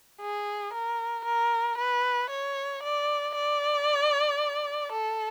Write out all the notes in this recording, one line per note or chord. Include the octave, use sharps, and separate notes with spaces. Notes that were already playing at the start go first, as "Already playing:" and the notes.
G#4
A#4
A#4
B4
C#5
D5
D5
A4